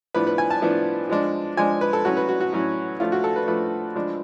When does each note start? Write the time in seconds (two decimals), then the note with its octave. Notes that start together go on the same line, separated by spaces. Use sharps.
0.14 A2 F3 B3 D4 B4
0.27 B4
0.38 G#5
0.50 A5
0.62 A2 F3 B3 D4
1.09 F3 G#3 D4
1.57 F3 G#3 D4 G#5
1.81 B4
1.93 A4
2.04 A2 F#3 C#4 F#4
2.17 B4
2.29 F#4
2.40 F#4
2.53 A2 F#3 C#4
3.00 F3 A3 D4 F4
3.12 F#4
3.24 A4
3.36 B4
3.47 F3 A3 D4 B4
3.95 F3 G#3 D4